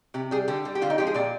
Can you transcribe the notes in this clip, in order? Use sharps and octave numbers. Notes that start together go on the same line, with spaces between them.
C3 G4
G3 G#4
D3 G4
G3
G4
D3 F4
D#4
F3 G#3 G4
G#4
A#2 D5